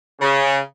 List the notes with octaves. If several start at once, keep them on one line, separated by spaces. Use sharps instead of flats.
C#3